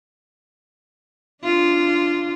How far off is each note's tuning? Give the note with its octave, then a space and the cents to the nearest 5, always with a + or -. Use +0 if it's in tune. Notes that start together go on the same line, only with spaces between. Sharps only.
D4 +0 F4 -10